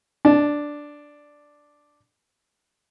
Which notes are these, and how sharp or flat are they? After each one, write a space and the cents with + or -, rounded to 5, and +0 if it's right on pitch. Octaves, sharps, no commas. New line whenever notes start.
D4 +0 A5 -25